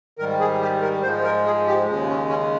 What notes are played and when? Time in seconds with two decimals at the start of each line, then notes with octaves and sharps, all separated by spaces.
0.18 G#2 D#3 G3 A#4
0.40 G#4
0.61 G4
0.82 A#4
1.02 G#2 F3 G#3 C5
1.24 A#4
1.45 G#4
1.66 G4
1.86 D#2 C#3 G#3
2.08 C#4
2.29 C#4